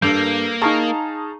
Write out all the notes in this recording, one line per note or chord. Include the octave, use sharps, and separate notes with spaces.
G2 A#3 A4 D6 G6
D#4 G#4 F5 A5 A#5 C#6